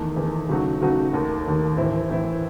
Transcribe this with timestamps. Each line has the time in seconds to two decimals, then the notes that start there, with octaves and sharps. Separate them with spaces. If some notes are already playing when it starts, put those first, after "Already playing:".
Already playing: E2 D#3 A3
0.17 E2 D#3 A3
0.49 C#3 F#3 A3 D#4 F#4
0.81 C#3 F#3 A3 D#4 F#4
1.13 D#2 D#3 A3
1.46 D#2 D#3 A3
1.77 A2 E3 C4 E4
2.09 A2 E3 C4 E4